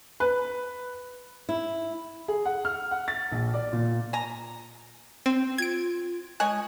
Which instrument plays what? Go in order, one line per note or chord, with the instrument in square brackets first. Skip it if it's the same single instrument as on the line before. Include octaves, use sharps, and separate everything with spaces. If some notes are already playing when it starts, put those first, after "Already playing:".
[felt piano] B4
[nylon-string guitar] E4
[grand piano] G#4
F#5
F6
F#5
A6
A#1
D5
A#2
[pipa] G#5 A#5
[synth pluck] C4
[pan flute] F4 [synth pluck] G#6 D7
[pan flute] G#3 [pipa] C#5 D#5 G#5 [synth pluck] F#6